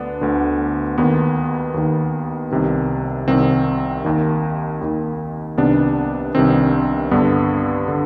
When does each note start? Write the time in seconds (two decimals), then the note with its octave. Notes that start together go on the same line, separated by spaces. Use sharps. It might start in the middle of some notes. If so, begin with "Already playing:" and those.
Already playing: D2 D3 B3 D4
0.21 D2 D3
0.98 D#2 D#3 B3
1.74 D#2 D#3
2.51 C2 C3 D#3
3.28 C2 C3 D#3 C4
4.05 D#2 D#3
4.81 D#2 D#3
5.58 C2 C3 D#3 B3 D4
6.35 C2 C3 D#3 C4
7.11 G2 D3 B3
7.88 D3